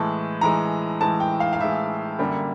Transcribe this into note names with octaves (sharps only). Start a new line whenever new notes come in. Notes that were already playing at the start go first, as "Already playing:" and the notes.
Already playing: A2 E3 G#3 A5
A2 E3 G#3 A#5
A2 E3 G#3 A5
G5
F5
F5
A2 E3 G#3 E5
F#2 D3 G3 A#3